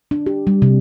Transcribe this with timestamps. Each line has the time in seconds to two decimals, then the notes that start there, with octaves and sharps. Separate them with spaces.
0.11 D4
0.26 G4
0.47 G3
0.62 C3